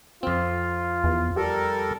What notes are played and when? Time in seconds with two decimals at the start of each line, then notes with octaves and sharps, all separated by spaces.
0.23 F2 C4 F4
1.04 E2
1.36 G3 G4 A4 A#4